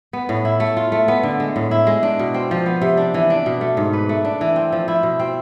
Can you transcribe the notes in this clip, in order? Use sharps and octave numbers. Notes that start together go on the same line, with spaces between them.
B3
A2
E4
A3
F4
A3
B3
D3
G#3
A2
E4
G#3
D4
B2
C4
F3
B3
C3
D4
E3
D4
B2
A3
G#2
B4
A3
D4
E3
C4
F3
E4
B2
C4